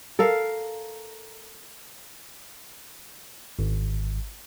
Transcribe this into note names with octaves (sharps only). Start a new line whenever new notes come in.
A4 A#4 F5
G#1